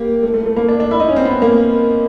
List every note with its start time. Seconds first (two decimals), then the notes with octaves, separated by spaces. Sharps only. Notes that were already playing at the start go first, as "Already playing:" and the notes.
Already playing: A#3 G4
0.23 A3
0.34 A3
0.46 A3
0.56 A#3
0.69 D4
0.80 D4
0.91 E4
1.00 D#4
1.09 C#4
1.16 C4
1.25 B3
1.42 A#3